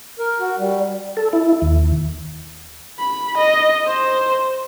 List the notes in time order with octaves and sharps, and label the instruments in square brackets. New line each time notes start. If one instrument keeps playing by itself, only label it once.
[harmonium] A#4
F#4
G3
[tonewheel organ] A4
E4
D#2
[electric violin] B5
D#5
C5